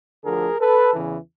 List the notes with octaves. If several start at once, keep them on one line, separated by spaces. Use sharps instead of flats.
D2 D3 F3 G#4 A#4
A4 B4
E2 C#3 E3